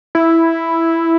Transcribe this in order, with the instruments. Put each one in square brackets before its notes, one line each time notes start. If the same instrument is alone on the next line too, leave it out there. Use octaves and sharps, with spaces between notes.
[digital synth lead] E4